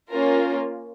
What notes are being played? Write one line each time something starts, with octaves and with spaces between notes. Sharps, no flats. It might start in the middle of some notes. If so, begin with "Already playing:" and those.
A#3 C#4 F4 A#4